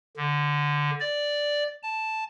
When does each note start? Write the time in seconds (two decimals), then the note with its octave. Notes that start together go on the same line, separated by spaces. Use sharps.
0.17 D3
1.00 D5
1.83 A5